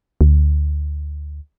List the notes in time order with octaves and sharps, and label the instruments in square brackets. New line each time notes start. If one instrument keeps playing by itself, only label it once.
[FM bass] D2